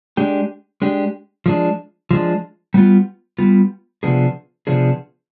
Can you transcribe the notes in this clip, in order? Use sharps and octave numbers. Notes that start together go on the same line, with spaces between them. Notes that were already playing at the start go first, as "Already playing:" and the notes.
G#3 D4 G4
G#3 D4 G4
F3 G#3 D4
F3 G#3 D4
G3 B3 F4
G3 B3 F4
C3 F3 B3 D4 G#4
C3 F3 B3 D4 G#4